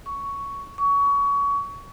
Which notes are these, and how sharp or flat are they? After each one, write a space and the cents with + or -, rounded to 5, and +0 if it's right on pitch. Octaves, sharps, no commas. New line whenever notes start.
C#6 +10
C#6 +25